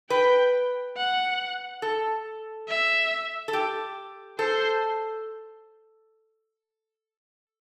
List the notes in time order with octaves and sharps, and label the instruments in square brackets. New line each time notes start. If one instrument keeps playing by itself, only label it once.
[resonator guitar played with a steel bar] B4 [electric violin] G5
[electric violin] F#5
[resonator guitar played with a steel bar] A4
[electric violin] E5
[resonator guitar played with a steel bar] A4
G4
[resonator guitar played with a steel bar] A4 [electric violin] C5